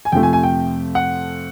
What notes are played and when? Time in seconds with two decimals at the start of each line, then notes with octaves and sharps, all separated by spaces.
0.05 G#5
0.12 F2 C3 F3 A3 G5
0.23 G#5
0.33 G#5
0.43 G5
0.95 F#5